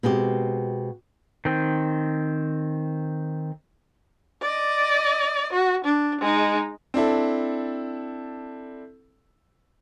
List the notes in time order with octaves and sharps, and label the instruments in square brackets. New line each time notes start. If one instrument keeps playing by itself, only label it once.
[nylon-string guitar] B2 G#3 C4 G4
[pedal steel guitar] D#3 C4
[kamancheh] D5 D#5
F#4
D4
G#3 D#4
[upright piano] C4 D4 E4 A4